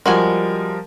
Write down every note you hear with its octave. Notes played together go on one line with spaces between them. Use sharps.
F3 G3 G#3 F#4 A#4 G#5